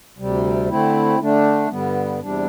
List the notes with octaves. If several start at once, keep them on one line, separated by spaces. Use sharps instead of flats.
D2 C3 G3
D3 A3 C4 E4
D3 A3 D4
G2 D3 G3 B3
E2 C3 G3 D4